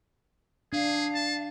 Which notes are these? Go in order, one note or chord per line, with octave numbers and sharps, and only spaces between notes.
D4 G#4 F5
A5